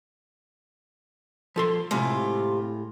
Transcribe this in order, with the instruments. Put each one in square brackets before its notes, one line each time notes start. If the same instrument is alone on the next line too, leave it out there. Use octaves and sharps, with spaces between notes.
[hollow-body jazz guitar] F3 A4 C6
[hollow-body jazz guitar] A2 G#3 [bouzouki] C3 F4